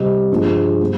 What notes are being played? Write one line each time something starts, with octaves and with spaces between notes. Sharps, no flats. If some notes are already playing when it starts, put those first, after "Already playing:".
Already playing: C3 G3 C4 D#5
G2 F3 G#3
G3 C4